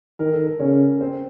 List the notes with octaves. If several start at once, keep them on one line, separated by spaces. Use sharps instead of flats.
D#3 A#4
A4
A#4
C#3 C#4 C#5
C4 C5